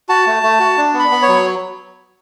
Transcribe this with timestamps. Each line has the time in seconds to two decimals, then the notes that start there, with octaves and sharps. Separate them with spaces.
0.09 F#4 A5
0.27 A3
0.43 A3
0.60 F#4
0.77 D4
0.93 B3
0.99 B5
1.11 B3
1.22 C#5
1.28 F#3